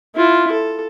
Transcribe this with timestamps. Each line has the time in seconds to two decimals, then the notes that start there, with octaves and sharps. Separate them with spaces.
0.16 E4 F4
0.51 A4